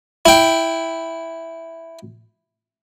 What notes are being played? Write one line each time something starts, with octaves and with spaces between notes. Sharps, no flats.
E4 G5